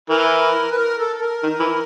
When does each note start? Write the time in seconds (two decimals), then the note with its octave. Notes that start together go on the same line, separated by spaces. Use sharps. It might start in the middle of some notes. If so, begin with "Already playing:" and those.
0.09 E3 A#4
0.71 B4
0.76 A#4
0.98 A4
1.16 A4
1.20 A#4
1.43 D#3
1.60 E3